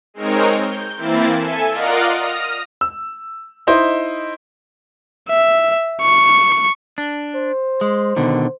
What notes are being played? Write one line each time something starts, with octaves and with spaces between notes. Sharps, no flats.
G#3 C4 D#4 A#4 C#5
G6
E3 A#3 C4 E4 A6
A4 E5 G#5
F4 A#4 D5 D#5 F5 F#5
D#6 F6 A#6
E6
D#4 E4 C5 D#5
E5
C#6
D4
C5
G#3
B2 D3 D#3